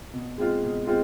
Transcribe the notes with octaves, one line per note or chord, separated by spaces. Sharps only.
B2
G#3 C4 F4
B2
G#3 C4 F4